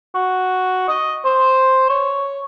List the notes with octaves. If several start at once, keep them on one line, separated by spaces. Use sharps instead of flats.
F#4
D#5
C5
C#5